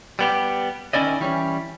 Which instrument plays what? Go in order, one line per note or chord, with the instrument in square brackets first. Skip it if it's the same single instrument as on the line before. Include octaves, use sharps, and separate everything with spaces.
[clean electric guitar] G3 B3 G4
D#3 C4 C#4 E4 D5 D#5
E3 G3 C#4